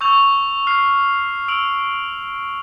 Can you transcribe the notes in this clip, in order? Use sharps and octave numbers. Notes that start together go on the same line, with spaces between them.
C#6 E6 G6 F7
F6 C7
E6 D7 F7 F#7